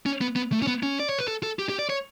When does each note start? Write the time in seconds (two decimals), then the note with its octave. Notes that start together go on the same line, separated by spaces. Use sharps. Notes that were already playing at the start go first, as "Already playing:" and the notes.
0.06 C#4
0.21 B3
0.36 B3
0.52 A3
0.62 C#4
0.67 B3
0.83 C#4
1.00 D5
1.09 C#5
1.18 B4
1.28 A4
1.43 A4
1.59 G4
1.69 G4
1.79 D5
1.90 C#5